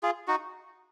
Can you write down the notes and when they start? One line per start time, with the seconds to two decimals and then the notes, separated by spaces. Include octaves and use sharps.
0.03 F4 G#4
0.28 D#4 F#4